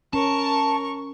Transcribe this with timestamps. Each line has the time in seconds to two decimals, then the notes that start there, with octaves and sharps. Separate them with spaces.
0.13 C#4 A#4 A5 C#6